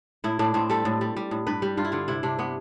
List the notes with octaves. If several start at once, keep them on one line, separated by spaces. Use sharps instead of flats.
A2 E4
A2 D4
A2 C4
G3 A4
A2
G3
G3
A2
G2 B4
G3
G2 F4
E4
D3 F4
C3 E4
C3 D4
C3 B3